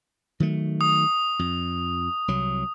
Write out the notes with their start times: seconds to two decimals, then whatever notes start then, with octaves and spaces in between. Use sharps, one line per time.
0.40 D#3 F#3 A3
0.81 D#6
1.39 F2
2.28 C2 F#3